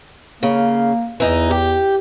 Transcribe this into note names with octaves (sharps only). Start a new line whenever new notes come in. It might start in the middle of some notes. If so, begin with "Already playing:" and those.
C#3 A#3
E2 E3 D#4
G4